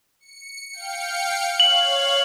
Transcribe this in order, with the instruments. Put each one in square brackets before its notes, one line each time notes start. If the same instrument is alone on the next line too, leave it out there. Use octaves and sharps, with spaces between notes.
[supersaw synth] C#7
F5 G5 C#7
[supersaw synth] C#5 F5 [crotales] F#7